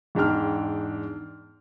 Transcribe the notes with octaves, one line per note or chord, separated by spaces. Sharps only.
E2 G#2 D4 G5 F6